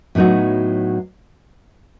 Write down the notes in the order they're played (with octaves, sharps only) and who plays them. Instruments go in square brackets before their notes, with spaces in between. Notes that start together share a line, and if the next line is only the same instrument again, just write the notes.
[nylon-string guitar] A2 F#3 B3 D#4 F#4